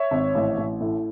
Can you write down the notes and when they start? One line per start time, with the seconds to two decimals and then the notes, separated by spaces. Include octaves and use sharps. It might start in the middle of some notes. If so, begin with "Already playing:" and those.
Already playing: C#5 E5
0.11 G#1
0.35 A1
0.58 A1
0.81 A2